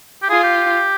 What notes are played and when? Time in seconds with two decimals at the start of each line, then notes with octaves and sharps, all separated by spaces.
0.22 G4
0.30 F4 G#4
0.44 G4